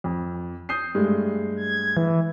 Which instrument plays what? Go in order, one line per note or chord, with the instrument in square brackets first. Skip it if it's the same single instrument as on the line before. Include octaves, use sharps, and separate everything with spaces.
[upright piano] F2
D#6 G6 C7
G2 G#3 A3
[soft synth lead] G#6
E3